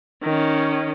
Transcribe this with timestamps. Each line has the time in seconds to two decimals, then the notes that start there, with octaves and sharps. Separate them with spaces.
0.23 D#3 C#4